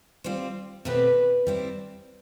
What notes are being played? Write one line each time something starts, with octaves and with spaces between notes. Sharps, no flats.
G3 C4 F4 C5
B2 A3 C4 G4 B4
G3 C4 E4